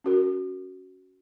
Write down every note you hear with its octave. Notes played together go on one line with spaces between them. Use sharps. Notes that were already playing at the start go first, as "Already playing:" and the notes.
C#4 F#4 A#4